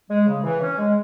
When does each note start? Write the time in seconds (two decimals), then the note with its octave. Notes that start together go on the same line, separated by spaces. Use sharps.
0.10 G#3
0.27 C#3
0.44 E3
0.61 C#4
0.78 G#3